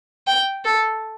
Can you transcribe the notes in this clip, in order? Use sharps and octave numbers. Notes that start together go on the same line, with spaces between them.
G5
A4